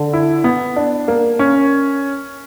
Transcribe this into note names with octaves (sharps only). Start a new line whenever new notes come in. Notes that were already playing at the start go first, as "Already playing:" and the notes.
Already playing: D3
E4
B3
D4
A#3
C#4